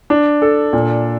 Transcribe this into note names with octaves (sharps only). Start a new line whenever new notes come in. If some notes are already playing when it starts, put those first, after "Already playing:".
D4
A4
A#2